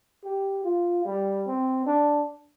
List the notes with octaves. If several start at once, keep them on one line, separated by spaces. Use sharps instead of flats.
G4
F4
G3
C4
D4